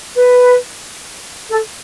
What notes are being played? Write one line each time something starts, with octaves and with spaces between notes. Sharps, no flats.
B4
A4